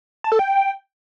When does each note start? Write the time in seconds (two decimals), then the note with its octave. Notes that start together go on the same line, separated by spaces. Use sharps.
0.24 A5
0.32 A4
0.39 G5